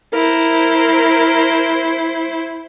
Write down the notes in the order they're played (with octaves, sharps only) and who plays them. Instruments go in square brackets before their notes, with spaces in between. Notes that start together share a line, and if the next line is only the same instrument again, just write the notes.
[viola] E4 C5 [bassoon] A#4